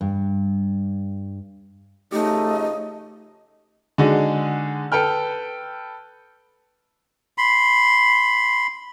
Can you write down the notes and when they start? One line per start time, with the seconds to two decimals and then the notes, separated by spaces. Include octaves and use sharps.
0.01 G2
2.12 C#3 F3 A3 D#4 G4 D#5
3.98 D3 G#3 D#4 F#4 G#4
4.92 A4 B4 G5 F6
7.38 B5 C6